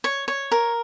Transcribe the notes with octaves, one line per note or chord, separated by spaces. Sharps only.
C#5
C#5
A#4